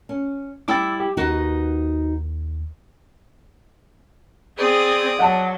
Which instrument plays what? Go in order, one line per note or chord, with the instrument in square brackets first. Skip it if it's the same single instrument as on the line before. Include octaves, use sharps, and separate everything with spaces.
[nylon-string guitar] C#4
[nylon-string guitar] G3 E4 G5 [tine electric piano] D6 E6 A6
[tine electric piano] G4
[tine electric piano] D#2 [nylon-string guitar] D#4 F#4 B4
[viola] C4 G#4 [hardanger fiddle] D5 D#6
[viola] F#3 [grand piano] F#5 A5